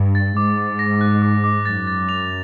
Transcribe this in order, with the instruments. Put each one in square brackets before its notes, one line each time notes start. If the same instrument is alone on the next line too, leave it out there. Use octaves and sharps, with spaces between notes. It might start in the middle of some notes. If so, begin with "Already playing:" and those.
Already playing: [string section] G2
[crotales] A6
[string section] G#2 [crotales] D6
[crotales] D6
A#6
F#6
D6
D6
[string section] F#2 [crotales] A6
[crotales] A6
F7